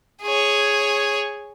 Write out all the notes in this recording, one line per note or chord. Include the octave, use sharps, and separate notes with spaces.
G#4 C#5